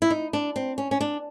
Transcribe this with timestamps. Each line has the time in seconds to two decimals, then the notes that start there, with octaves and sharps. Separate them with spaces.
0.02 E4
0.10 D#4
0.33 D4
0.56 C4
0.78 C#4
0.91 C#4
1.01 D4